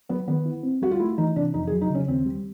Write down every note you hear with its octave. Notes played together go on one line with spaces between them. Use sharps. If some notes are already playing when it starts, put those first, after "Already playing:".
F#3 B3
D#3 B3
E4
C4
G3 F#4
F4
A3 E4
E3 D#4
C3 D4
F2 D#4
G#4
F#3
D#4
C#3 C#4
D#2 C4
G3